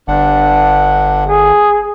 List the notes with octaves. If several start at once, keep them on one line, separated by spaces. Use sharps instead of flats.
G1 G2 D4 F#5
G#4